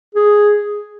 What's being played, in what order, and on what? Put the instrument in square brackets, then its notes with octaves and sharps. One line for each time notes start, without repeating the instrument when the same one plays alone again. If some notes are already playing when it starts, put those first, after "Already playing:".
[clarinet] G#4